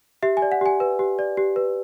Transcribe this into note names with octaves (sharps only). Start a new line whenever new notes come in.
G4 E5
G#5
D5
F#5
G4 G#5
B4
G4
D5
G4
B4